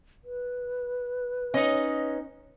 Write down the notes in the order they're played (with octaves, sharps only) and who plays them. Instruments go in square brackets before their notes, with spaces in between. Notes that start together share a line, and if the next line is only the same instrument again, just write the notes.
[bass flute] B4
[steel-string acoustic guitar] C#4 [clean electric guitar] D#4 D#5